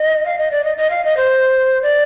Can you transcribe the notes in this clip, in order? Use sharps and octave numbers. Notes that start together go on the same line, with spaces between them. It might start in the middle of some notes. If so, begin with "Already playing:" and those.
Already playing: D#5
F5
D#5
D5
D#5
D#5
F5
D#5
C5
D5